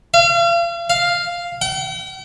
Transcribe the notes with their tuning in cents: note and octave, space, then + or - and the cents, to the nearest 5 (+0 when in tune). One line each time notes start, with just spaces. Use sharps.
F5 -40
F5 +0
G5 -45